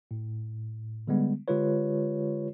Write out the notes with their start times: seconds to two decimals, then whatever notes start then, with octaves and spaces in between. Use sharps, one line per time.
0.11 A2
1.07 D3 G3 G#3 B3
1.48 D3 G#3 F4 G4 B4 C#5